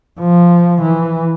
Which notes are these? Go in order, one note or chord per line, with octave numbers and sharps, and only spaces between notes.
F3
E3